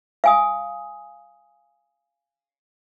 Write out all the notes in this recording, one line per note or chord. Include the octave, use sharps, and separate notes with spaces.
F5 G#5 D#6